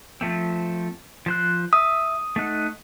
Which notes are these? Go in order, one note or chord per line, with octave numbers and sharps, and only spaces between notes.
F3 A3 C4
F3 C5 F#6
E5 D#6
A3 D#4 F#5